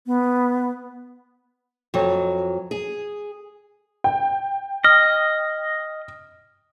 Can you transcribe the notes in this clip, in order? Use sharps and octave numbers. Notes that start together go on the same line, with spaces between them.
B3
F2 F#3
G#4
G5
D#5 F6